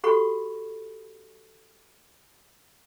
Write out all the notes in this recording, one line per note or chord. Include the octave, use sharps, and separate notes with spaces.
F#4 G4 A4 F#5 B5 C#6